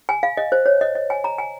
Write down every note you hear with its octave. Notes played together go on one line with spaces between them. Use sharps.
G#5
F5
D#5
C5
C#5
D#5
D#5
G#5
A#5
G#5